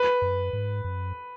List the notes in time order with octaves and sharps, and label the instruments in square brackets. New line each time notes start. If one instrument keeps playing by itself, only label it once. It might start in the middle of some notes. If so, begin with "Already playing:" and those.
Already playing: [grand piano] B4
[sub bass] F#2
G#2
F#2